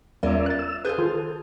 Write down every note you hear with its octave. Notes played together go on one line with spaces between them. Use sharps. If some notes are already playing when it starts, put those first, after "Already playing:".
E2 G3 C#4 F4 A#4 D5 E5
F#6 A6
E6
G#4 A4 B4 C5 F5 G6
D#3 F4